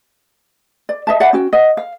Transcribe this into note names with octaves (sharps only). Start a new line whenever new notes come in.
D5
D#5 E5 A5
D5 E5 F#5 B5
C#4 F#4 G5
D#5 F#5
F5